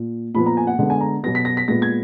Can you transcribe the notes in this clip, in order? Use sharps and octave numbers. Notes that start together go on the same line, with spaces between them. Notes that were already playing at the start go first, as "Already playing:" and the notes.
Already playing: A#2
A#2 F3 B3 B5
A#5
G#5
F#5
D3 G#3 B3 F#5
G#5
A#5
B2 F#3 B3 A#6
B6
A#6
B6
A#2 G#3 B3 A#6
G#6